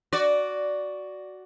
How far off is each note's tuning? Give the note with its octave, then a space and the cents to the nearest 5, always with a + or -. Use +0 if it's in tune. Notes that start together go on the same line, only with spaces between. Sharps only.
F#4 +5 D5 -5